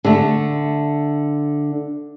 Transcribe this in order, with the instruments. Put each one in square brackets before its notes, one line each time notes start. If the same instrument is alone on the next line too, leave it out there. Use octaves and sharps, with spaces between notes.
[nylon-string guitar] D3 A3